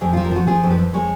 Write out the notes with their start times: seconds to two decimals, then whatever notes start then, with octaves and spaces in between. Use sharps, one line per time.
0.01 F2 G#4
0.13 F3 F4
0.24 A#4
0.31 F3 F#4
0.47 F3 G#4
0.63 F2
0.70 B4
0.78 F2
0.94 G#3 C#5